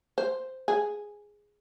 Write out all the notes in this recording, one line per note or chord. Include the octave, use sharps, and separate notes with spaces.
C5
G#4